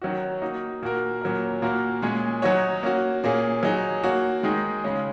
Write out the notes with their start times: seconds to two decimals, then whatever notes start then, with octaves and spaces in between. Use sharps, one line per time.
0.01 D#3 F#3 C#4 F#4
0.42 A#3 D#4 F#4
0.82 A#2 A#3 F#4 A#4
1.21 A#2 F#3 C#4 A#4
1.62 A#2 A#3 F#4 A#4
2.02 A#2 G#3 C#4 G#4 C#5
2.42 F#3 D#4 F#4 C#5
2.83 A#3 C#4 F#4
3.24 A#2 A#3 C#4 G#4
3.63 F#3 D#4 G#4
4.03 A#3 F#4 C#5
4.43 D#3 G#3 D#4 G#4
4.84 C#3 G#3 C#4